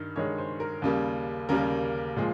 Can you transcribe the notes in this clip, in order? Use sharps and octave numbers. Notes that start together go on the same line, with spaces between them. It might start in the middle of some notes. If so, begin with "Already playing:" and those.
Already playing: G2 D#3
G2 D#3 G#3 C#5
C5
A#4
D#2 C#3 G3 A#3
D#2 C#3 G3 A#3 A#4
A#2 F3 G#3